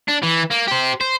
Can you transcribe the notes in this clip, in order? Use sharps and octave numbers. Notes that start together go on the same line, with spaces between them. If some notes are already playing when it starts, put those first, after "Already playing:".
D4
E3
A#3
G4 C5
C5